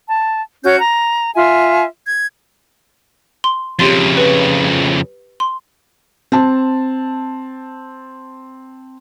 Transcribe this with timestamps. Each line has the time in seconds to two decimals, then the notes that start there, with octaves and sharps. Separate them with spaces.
0.07 A5
0.63 C#4 F#4 C#5 G6
0.79 A#5
1.35 F4 E5 G#5
2.05 G#6
3.44 C6
3.79 F2 C#3 G4 C6 A6
4.17 B4
5.40 C6
6.32 C4 A5